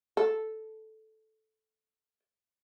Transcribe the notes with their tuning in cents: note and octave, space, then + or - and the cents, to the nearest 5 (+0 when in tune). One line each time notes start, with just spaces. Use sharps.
A4 -5